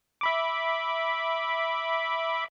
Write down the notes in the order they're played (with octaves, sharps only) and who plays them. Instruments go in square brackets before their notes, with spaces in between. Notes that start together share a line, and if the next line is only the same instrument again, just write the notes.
[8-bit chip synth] E5 B5 D6